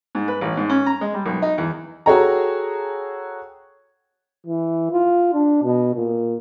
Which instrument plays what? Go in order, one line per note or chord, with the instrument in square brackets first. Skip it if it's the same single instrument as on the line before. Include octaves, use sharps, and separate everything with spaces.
[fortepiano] G#2
B4
A1
G#2
C#4
A#5
G#3
G3
B1
D#4
E2
[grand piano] F#4 G#4 A4 C#5 G5 A#5
[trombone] E3
F4
D4
B2
A#2